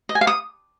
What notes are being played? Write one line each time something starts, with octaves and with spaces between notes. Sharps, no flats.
D#5
G#5
F5
D#6